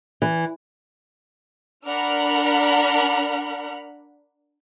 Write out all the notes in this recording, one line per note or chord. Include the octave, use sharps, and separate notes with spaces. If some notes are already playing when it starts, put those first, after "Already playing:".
E3
D4 A#4 F#5 B5 F6